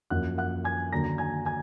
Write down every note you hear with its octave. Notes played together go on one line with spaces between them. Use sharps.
F#2 F3 A#3 F#5 F#6
F#5 F#6
G#5 G#6
D#2 D3 F#3 A#3 A#5 A#6
G#5 G#6
G#5 G#6